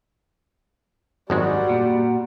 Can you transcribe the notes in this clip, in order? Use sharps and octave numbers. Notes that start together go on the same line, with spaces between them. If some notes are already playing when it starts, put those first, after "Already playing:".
G#1 F#2 G3 G#3 F#4
A#2